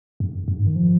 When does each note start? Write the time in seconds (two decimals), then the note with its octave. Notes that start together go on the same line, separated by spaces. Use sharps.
0.20 F#2
0.48 F#2
0.57 G#2
0.67 D#3
0.76 F3